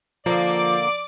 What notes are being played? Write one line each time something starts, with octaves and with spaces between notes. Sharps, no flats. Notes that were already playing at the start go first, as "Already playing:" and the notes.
D3 F3 A#3 D5 D6